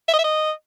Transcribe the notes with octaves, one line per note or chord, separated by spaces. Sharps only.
E5
D#5
E5
D#5